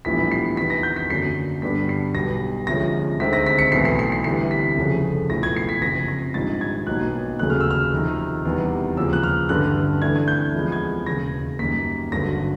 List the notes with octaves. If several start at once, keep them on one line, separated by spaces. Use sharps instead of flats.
A#1 A2 E3 G3 B3 B6
C7
E2 C3 D#3 B6
A#6
G6
B6
F#2 D3 F#3 A#3 C7
G2 D3 G3 B3 D4 B6
C7
B1 B2 G3 A#6
D2 C3 F3 G#3 C#4 A#6
D2 C3 D#3 G#3 C4 B6
A#6
B6
C#7
B1 A2 E3 C7
C7
C7
C7
D2 C3 E3 G3 C7
B6
F1 F2 C#3 F3
B1 A2 F3 A#6
G#6
C7
B6
F#1 F2 C3 A#6
A#6
A#1 G#2 D#3 G3 A6
G#6
B1 B2 F#3 A#3 D#4 F#6
F1 D#2 C#3 F#3 A3 F#6
F6
E6
F6
F2 C3 D#3
E2 C3 D#3 G3
D#2 C#3 F3 A#3 E6
F#6
F6
A1 G2 D3 G3 F#6
D2 C3 E3 A3 D4 G#6
G#6
G6
E2 C3 F3 G#3 B3
G#6
E1 D#2 C#3 A#6
F#2 D#3 G3 A#3 B6
G#1 G2 D3 F#3 A#6